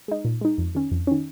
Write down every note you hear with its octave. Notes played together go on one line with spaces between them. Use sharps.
G#3 D#4
A#2
G#3 D#4
F2
D#3 C#4
F2
D#3 C#4